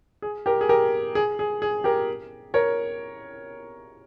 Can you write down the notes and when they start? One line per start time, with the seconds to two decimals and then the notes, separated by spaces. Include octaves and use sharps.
0.22 G#4
0.46 G4 A#4
0.61 G#4
0.69 G4 A#4
1.15 G#4
1.39 G#4
1.62 G#4
1.84 G4 A#4
2.54 A#4 C#5